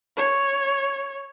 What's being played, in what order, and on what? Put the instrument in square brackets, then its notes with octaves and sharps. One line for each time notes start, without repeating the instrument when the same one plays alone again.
[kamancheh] C#5